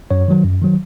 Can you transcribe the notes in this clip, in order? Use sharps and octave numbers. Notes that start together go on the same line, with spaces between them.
F#2 C#5
D#3 F#3
F#2
D#3 F#3